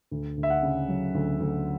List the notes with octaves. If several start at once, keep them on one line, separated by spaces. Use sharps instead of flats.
D2
D2
E5
F#5
C#3
F#3
D2
D2